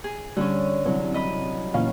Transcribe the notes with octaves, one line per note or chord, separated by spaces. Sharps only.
G#4
D3 G3 C#4
C2 F#3
D#5 B5 D#6
E2 A#2 C#4 F5